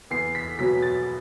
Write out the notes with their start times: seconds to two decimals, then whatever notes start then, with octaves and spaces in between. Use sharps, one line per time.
0.10 E2 C7
0.35 B6
0.59 B2 F#3 B6
0.82 A6